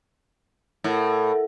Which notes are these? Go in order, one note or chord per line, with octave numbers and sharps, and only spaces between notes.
A2 A4 A#4 F#5